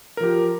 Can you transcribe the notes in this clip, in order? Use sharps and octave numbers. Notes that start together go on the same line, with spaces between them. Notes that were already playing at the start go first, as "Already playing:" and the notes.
F3 G4 A#4